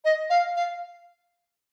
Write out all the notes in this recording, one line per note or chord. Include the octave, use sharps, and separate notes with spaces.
D#5
F5
F5